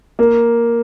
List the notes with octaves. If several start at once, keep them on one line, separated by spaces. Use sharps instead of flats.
A#3